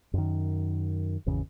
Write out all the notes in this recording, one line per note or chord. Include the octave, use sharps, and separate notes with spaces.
F#2 D#3
G#1 E2 C#3